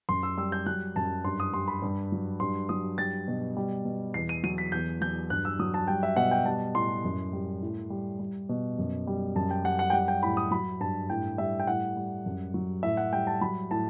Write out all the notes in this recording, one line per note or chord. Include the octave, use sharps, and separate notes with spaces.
F#2 C6
E6
G3 E6
G6
F#3 F#6
F#2 A5
G2 C6
D#6
G3 C6
B5
G2
F#3
G2 C6
F#3 D#6
G3 A6
B2
G3
B2
E2 C7
D#7
F#3 D#7
B6
E2 G6
F#3 G6
G2 F#6
E6
F#3 D#6
A5
G3 G5
E5
B2 F#5
G5
G3 A5
A2 C6
F#2
G3
A2
G3
G3
B2
F#2
G3
F#2 A5
G5
G3 F#5
F#5
G5
G3 F#5
G5
A2 B5
D#6
F#3 B5
G2 A5
A2 G5
G3 E5
G5
A2 F#5
G3
F#2
F#3
A2 E5
F#5
G3 G5
A5
F#3 B5
A2 A5